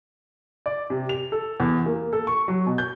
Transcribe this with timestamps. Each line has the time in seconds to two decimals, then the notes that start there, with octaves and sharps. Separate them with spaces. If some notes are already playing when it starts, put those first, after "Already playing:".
0.66 D5
0.90 C3
1.09 F7
1.32 A4
1.60 E2
1.86 A#3
2.13 A4
2.27 C#6
2.48 F#3
2.66 B2
2.78 G6